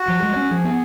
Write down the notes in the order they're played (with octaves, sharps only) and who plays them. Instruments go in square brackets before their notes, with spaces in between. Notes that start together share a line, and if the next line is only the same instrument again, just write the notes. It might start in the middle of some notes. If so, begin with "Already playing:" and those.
Already playing: [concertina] F#4
[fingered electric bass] F3
G#3
C#4
[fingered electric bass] F3 [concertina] G#4
[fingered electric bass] B3